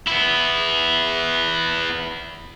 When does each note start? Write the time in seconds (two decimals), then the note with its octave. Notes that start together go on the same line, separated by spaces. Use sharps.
0.08 B3 E4